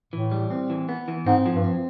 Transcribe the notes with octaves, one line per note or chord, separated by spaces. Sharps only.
A2 E3
G3
C4
E3
B3
E3
G#2 C4
F3
G2
C4